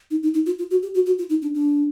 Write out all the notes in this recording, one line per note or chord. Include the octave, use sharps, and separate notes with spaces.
D#4
D#4
D#4
F4
F4
F#4
G4
F#4
F#4
F4
D#4
D4
D4